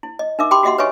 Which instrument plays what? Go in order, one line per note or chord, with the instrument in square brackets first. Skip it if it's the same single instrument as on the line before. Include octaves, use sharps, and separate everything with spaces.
[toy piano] E4
D#5
D#4 A#4 E5 D6
G4 G5 A5 B5 C6 D6
F#4 G4 D#5 E5 F#5 C6
B4 C#5 D#5 E5 G#5 C#6